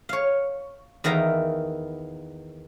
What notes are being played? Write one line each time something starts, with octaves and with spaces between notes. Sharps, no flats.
C#5 F5
E2 D#3 E3 F5 A#5